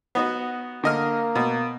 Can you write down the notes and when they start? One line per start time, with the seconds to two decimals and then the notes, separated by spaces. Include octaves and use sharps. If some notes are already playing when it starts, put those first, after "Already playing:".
0.15 B3 D#4 F#4
0.83 D3 A#3 D#5 F6
1.35 B2